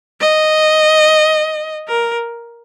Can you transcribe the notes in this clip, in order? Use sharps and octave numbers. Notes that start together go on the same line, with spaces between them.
D#5
A#4